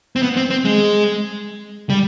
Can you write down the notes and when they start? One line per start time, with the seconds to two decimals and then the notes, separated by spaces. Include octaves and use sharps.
0.16 C4
0.23 B3
0.37 C4
0.50 C4
0.65 G#3
1.90 G3